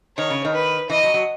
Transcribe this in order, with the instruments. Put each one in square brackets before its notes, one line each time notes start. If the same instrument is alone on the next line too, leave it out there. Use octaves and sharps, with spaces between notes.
[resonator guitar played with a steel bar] D#3 [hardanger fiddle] C#5
[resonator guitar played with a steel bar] C#3
D#3
[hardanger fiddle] B4
[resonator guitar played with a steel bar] E3 [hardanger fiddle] D#5
[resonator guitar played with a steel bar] F#3
F#3